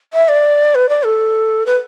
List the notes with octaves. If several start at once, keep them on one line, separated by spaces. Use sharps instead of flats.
E5
D5
B4
D5
A4
B4